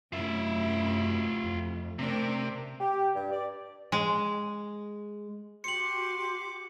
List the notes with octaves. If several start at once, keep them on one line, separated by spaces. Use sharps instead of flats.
F#2 C3 A3 E4 F4 E5
F2
C3 A3 C4 D4 A#4
G4
G2
D5
G#3
F#4 G4 C6 D6 C#7 F#7